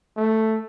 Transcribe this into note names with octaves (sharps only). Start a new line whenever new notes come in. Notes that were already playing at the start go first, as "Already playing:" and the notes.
A3